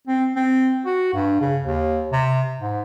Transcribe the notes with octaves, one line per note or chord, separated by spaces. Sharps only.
C4
C4
F#4
G2
C#3
D#2
C3
G#2